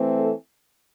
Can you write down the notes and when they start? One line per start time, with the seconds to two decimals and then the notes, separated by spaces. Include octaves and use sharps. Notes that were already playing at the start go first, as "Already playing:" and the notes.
Already playing: E3 A3 C4
0.18 A4